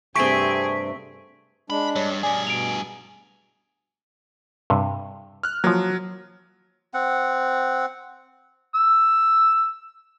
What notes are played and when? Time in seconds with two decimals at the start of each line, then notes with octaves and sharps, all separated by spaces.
0.16 G2 C3 A3 C4 G#4 C#6 B6 D7
1.70 G#3 D4 B5
1.96 G2 C#5
2.23 G2 G#4 D5 G#5
2.47 B2 D7 F7
4.70 G2 C3
5.43 F6 F#6
5.64 F3 F#3 A#3
6.94 C4 F#5
8.75 E6